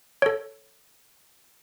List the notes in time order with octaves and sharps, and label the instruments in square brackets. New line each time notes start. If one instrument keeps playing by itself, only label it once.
[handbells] A4 C#5